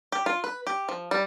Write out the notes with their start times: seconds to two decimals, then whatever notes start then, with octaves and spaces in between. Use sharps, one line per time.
0.12 G4
0.26 F4
0.44 B4
0.67 G4
0.89 F3
1.11 G3